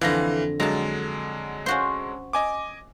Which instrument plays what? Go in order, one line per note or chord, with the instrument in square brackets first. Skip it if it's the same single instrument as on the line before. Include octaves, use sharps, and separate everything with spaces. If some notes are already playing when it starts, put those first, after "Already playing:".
[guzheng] F2 D3 [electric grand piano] E3 F5 A#6
[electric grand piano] D3 F#3 G#3 [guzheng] A5 A#5
[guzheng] C#4 F#4 C5
[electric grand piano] D#5 G#5 D6